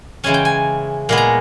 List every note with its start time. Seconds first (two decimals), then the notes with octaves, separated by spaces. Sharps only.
0.24 C#3 E3 G#3 C#4 G#5
0.34 G5
0.45 G#5
1.09 A#2 G#3 B3
1.17 A#5